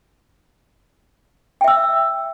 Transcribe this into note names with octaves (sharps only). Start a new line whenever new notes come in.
E5 G5 E6